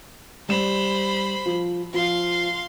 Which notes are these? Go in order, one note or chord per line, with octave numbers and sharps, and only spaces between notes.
G3 C5 B5 E7
F3
F3 F5 C6